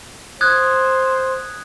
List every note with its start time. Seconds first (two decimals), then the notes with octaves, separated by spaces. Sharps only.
0.41 C5 D#6 F#6 G#6